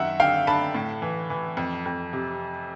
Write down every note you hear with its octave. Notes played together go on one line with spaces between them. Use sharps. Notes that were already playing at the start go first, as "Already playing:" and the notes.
Already playing: F#2 D#3 E5 F#5
D3 F5 G5
D3 A5 B5
A2
E3
E3
F2
F2
C3